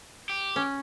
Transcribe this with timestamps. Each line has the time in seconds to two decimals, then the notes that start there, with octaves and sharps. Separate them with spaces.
0.29 G4
0.56 C#4